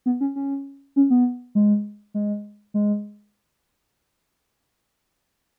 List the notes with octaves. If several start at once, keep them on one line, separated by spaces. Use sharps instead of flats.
B3
C#4
C#4
C#4
B3
G#3
G#3
G#3